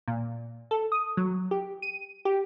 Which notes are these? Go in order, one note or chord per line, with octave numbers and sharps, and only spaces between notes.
A#2
A4
D#6
F#3
G4
D#7
G4